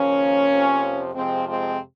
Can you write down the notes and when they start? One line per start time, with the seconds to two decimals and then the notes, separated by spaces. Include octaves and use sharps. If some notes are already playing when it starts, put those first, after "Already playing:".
Already playing: D#2 C#3 F3 A#3 C#4
0.48 F2 C3 F3
1.15 F2 C3 F3 G#3 C4
1.48 G#3 C4